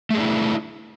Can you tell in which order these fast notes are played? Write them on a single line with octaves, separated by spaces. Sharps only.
A3 G#4 D4 E4